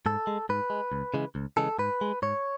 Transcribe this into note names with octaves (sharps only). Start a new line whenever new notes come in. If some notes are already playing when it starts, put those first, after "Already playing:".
G#2 A4
G#3
G#2 B4
G#3
C#2
C#3 E3 G#3
C#2
C#3 E3 G#3 A4
G#2 B4
G#3
G#2 C#5